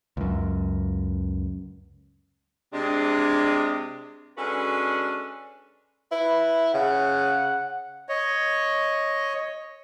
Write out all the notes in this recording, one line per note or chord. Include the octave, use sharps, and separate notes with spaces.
C#2 F#2
C3 G#3 D4
G#3 C#4 D4 F#4 A4 B4
E4 B4
C#3 F#5
C#5 D#5